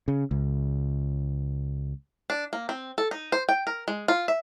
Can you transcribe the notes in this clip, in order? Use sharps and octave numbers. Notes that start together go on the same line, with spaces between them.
C#3
C#2
D4
A#3
C4
A4
D#4
C5
G5
A#4
G#3
F4
E5